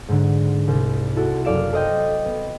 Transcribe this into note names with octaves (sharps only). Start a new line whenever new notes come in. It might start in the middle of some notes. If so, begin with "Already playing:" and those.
G#2 D3
C2
E4 F#4 A4
F#1 A4 D5 F5 E7
A4 C5 D#5 G5
B3